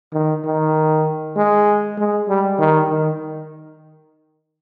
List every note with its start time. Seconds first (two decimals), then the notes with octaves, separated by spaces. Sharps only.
0.13 D#3
0.45 D#3
1.37 G#3
1.98 G#3
2.29 G3
2.59 D#3
2.89 D#3